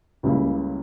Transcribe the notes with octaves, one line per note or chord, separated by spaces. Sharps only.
C#2 C#3 G3 A#3 E4